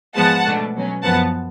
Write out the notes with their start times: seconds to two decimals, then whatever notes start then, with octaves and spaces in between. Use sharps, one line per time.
0.16 G#2 F3 G#3 B3 F#5 A5
0.46 B2 A3 D4
0.75 B2 F#3 C#4
1.04 F#2 F3 B3 F#5 A5